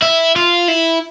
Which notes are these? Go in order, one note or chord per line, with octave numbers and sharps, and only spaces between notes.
E4
F4
E4